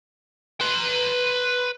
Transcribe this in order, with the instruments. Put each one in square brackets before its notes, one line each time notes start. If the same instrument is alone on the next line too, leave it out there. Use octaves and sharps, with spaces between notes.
[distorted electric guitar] B4 C6